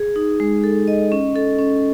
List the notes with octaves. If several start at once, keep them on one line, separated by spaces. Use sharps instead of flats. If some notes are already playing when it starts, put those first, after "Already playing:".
Already playing: G#4
D#4
G#3
A4
D#5
C#4
A4
C#4